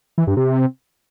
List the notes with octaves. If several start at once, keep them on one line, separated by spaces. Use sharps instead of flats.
E3
G2
C3